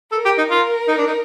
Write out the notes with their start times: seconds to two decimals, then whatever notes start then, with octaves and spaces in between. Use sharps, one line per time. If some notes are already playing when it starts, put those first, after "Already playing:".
0.12 A4 A#4
0.25 G4
0.38 D#4
0.50 F4
0.88 D#4
0.98 D4
1.07 D#4